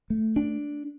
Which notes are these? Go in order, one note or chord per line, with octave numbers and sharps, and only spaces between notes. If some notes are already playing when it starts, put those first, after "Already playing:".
A3
D4